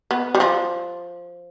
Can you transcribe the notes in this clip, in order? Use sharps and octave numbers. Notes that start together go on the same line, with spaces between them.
B3
G3
F3